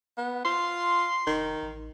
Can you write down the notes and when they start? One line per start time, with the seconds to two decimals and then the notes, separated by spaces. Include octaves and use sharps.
0.18 B3
0.45 F4 C6
1.27 F1 D#3
1.63 A1